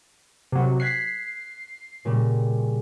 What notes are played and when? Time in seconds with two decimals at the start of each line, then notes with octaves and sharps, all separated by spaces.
0.52 C3 F#3
0.80 F#6 G#6 B6 C7
2.05 A#2 C#3 G3